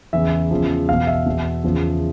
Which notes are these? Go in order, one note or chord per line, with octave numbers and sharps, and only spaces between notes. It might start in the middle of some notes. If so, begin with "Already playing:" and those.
E2 C#3 E3 E5
E2 C#3 F3
E2 B2 F5
E5
E2 B2
E2 C#3 F3